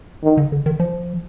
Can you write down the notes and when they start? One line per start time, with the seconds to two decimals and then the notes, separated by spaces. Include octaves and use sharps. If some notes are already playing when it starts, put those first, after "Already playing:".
0.23 D#3
0.37 D3
0.52 D3
0.66 D#3
0.80 F3